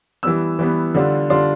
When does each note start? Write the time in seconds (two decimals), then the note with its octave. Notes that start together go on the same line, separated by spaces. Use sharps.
0.23 E3 G3 B3 E6
0.59 E3 G3 B3
0.94 D3 G3 D4 F4
1.30 D3 G3 D4 F4 C6